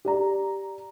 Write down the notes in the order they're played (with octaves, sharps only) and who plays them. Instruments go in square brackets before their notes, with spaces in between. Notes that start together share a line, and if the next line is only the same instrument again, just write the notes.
[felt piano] G4 D5 A#5